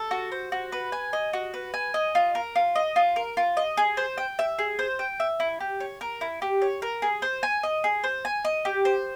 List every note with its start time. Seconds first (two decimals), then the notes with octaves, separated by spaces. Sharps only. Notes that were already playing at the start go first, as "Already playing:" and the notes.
Already playing: A4
0.11 F#4
0.32 C5
0.52 F#4
0.72 B4
0.92 G#5
1.13 D#5
1.33 F#4
1.54 B4
1.74 G#5
1.94 D#5
2.15 F4
2.35 A#4
2.55 F4
2.75 D#5
2.96 F4
3.16 A#4
3.37 F4
3.57 D#5
3.77 G#4
3.97 C5
4.18 G5
4.39 E5
4.59 G#4
4.79 C5
4.99 G5
5.20 E5
5.40 E4
5.60 G4
5.80 C#5
6.01 A#4
6.21 E4
6.42 G4
6.62 C#5
6.82 A#4
7.02 G#4
7.22 C5
7.43 G#5
7.63 D#5
7.84 G#4
8.04 C5
8.25 G#5
8.45 D#5
8.65 G4
8.85 C5